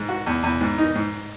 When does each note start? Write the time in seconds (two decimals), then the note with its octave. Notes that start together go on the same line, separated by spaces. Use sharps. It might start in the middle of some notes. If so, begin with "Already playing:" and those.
Already playing: G#2
0.09 F#4
0.26 E2
0.43 E2
0.61 G#2
0.78 D#4
0.95 G#2